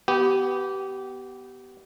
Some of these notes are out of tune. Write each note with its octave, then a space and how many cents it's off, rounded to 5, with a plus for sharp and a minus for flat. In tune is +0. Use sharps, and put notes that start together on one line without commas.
B3 +0 G4 -20